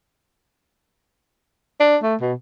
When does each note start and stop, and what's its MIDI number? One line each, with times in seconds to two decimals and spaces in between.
1.80 1.96 62
2.03 2.15 57
2.21 2.33 47